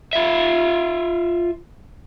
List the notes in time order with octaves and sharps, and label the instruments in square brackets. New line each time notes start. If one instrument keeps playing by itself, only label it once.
[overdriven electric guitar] F4 E5